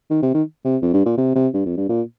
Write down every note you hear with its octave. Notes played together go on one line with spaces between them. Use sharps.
D#3
C3
D#3
C3
F2
G2
A#2
C3
C3
G2
F2
G2
A#2